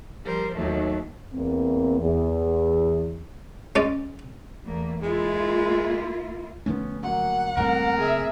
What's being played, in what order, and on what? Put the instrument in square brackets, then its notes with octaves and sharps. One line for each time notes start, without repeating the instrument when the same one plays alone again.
[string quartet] F3 G3 A#4 C5
D#2 B2 D#3 F#3 A3
[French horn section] E2 A#3 C4
E2
[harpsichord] G#3 C#4 D5
[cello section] E2 A3 A#3
[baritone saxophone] G#3 [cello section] A#3 E4 F4
[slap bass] D3 F3 A3 [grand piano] B3 C#4
[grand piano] F#3 A#3 [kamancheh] F#5
[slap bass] A1 F#2 G3 [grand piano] A3 A#3 C4 [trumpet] A#4
[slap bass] F#1 [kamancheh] G#4 E5